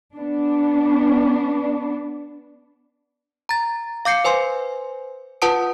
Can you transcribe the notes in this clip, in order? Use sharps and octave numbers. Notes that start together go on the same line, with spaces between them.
B3 D4
A#5 A6
F5 D6 G6 C7 C#7
B4 C5 G#5 C6
F4 B4 F#5 A5 D#6 D7